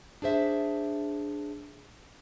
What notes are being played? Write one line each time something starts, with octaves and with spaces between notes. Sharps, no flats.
D4 G#4 C5 E5